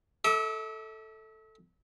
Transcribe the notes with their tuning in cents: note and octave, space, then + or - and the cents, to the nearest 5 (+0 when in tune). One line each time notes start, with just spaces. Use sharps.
A4 +0 E5 -40 D6 +0